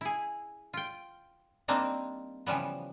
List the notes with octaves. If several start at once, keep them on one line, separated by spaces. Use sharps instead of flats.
E4 G#4
F4 G5
G3 A#3 C4 D4 D#4
C#3 E3 F3 G3 B3